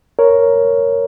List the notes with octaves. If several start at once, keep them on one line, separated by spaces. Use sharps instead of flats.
A#4 C#5